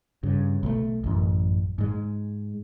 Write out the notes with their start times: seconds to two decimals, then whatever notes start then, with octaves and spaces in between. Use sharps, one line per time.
0.23 G2 C#3
0.63 B1 F3 A3
1.04 A1 F#2
1.78 G#2 G#3